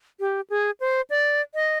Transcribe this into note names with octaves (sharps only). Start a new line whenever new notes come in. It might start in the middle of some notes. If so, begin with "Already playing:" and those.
G4
G#4
C5
D5
D#5